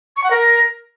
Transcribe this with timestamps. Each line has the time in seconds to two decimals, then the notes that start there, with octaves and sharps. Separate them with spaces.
0.16 C#6
0.23 F#5
0.31 A#4